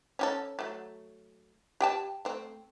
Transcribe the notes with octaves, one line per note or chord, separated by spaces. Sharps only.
C#4 G4 A4
F#3 A3
G4 G5 A5
A3 C4